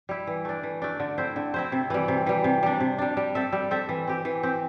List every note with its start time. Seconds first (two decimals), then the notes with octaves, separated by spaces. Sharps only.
0.09 G3 E4
0.27 E3
0.45 A3 D4
0.63 E3
0.82 A3 D4
1.00 D3
1.18 C4 E4 C5
1.36 D3
1.54 C4 E4 C5
1.72 C3
1.90 E3 G3
2.08 C3
2.26 E3 G3
2.44 C3
2.63 G3 D4
2.80 C3
2.98 G3 D4
3.17 G3
3.35 C4 A4 E5
3.52 G3
3.71 C4 A4 E5
3.89 E3
4.07 C4 G4
4.25 E3
4.43 C4 G4